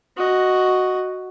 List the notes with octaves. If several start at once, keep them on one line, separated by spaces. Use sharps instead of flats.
F#4 D#5